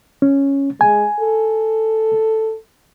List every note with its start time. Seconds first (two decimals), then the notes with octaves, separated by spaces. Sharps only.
0.22 C#4
0.81 G#3 G#5
1.20 A4